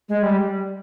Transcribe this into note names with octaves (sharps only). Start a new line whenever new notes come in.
G#3
G3